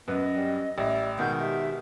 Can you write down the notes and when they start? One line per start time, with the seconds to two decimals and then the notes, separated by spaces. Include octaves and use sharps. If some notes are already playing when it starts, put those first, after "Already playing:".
0.08 F#2 B3 C#4 B4 D#5
0.36 G3
0.78 A1 G3 E5 A#6
1.19 B2 D#3 G#3 F#5 G6
1.39 G4 E5